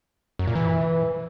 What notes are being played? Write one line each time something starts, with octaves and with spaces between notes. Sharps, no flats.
F#2
A#2
E3